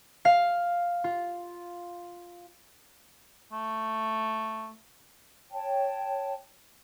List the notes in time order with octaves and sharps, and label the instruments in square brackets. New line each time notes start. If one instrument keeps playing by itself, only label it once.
[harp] F5
F4
[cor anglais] A3
[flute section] C#5 G5 A5